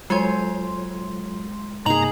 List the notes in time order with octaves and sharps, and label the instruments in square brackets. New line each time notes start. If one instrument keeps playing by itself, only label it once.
[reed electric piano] F#3 F4 A4 [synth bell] G#3 C6 [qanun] C5 C#5 G#5
[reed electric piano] G2 C3 A#3 [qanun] D#4 G#4 [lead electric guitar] A#5 [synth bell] F#7